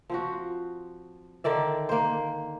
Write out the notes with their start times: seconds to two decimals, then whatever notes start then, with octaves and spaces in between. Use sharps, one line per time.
0.10 F3 C4 F#4
1.44 D3 D#3 D5 E5
1.89 A#3 C5